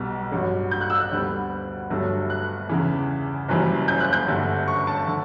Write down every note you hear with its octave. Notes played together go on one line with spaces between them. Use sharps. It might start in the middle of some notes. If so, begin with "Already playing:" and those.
Already playing: B1 B2 G3 B3
A1 G2 F#3
G6
F#6
E6
F#6
D2 D3 G3 B3
G1 G2 F#3 A3
F#6
E2 C#3 E3
F#1 F#2 E3 G3
G6
F#6
G6
G1 G2 D3 A3
C#6
A5
D3